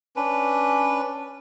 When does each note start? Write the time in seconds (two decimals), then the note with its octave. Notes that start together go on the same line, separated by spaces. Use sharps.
0.16 C#4 D4 B4